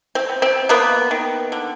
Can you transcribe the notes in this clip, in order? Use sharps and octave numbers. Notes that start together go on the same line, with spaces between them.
C4
B3
C4
A#3 B3
D#3
D3